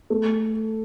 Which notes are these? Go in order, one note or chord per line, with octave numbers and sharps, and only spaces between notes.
A3